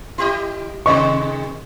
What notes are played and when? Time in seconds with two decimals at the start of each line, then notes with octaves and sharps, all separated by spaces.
0.18 E4 G4 D#5
0.86 C3 D#3 G#3 D#5 C#6